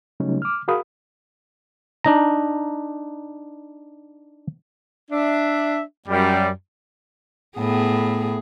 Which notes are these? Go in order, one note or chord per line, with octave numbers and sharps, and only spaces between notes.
C#3 F#3 G3 A3 C#4 D#4
D6 F6
F#4 G#4 A#4 F5 B5 D#6
D4 D#4 A#5
D4 E5
F#2 G3
A2 B3 G#4